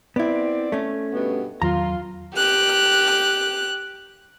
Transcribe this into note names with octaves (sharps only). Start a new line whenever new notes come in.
B3 C4 E4 D5
A3 C#4
G2 B2 B3
E2 D#3 F#3 F4 A#5
G4 F#6